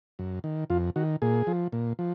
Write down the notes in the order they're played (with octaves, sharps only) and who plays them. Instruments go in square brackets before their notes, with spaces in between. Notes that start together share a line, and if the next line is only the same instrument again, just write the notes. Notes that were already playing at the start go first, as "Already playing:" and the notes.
[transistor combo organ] F#2
D#3
F2 F4
D#3 F#4
A#2 G#4
F3
A#2
F3